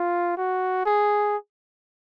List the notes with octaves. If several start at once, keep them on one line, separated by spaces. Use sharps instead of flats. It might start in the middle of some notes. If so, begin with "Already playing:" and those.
Already playing: F4
F#4
G#4